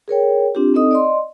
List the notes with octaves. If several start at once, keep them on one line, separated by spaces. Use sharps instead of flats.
G#4 A#4 C#5 G5
C4 D4 F4 G4
C4 D#4 A4 D#5 D#6
D5 D#5 C6